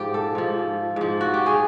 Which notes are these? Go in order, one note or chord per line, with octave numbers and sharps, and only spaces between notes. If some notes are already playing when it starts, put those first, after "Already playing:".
Already playing: G#2 F3 G4
A4
G#2 F3
G#2 F3
F#4
G4
G#4